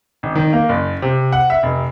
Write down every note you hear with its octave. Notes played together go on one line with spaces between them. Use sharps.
G#1
D#3
A#3
F#1
C3
F#5
E5
F1